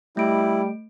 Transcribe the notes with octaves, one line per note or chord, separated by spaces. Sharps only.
G3 A3 E4 D7